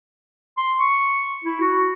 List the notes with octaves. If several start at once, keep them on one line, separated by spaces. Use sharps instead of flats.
C6
C#6
E4
F#4